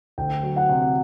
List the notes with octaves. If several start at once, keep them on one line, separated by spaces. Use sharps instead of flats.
D2 G5
F#3
F#5
C3